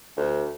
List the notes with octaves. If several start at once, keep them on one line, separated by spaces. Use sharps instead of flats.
D2